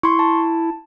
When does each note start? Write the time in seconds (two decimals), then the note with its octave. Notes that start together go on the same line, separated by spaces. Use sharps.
0.03 E4 C6 C#6
0.19 A5